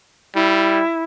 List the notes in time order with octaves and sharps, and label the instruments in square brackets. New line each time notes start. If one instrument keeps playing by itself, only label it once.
[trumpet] G3 [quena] E4